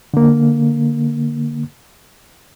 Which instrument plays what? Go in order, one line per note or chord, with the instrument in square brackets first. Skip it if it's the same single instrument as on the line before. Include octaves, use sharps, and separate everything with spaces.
[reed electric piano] D3 A#3